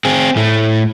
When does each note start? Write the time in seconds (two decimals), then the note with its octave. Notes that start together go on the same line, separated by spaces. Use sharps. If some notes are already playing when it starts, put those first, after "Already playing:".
0.05 C4 G#4
0.36 A2 A3